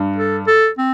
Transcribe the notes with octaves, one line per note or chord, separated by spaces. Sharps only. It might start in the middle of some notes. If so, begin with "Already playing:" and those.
Already playing: G2
A4
A4
C4